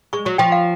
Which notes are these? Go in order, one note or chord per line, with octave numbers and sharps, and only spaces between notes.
G#3 C#6
F#3 C#6
F3 G5
F5